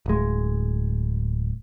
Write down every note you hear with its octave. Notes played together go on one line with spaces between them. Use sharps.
D1 G#3